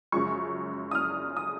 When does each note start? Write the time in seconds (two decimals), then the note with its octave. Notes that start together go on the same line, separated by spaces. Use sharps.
0.12 F#2 C#3 F3 G#3 C#6
0.91 D#6
0.95 F6
1.37 D#6